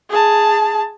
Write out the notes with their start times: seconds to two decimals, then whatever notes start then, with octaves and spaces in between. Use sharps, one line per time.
0.10 G#4 A5